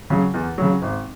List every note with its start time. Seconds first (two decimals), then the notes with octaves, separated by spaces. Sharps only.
0.10 C#3 F#3
0.34 E2
0.58 C#3 F#3
0.82 G#1